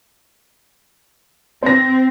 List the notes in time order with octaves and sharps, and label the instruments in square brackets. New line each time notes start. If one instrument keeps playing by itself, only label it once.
[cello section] C4 [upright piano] C5 A#6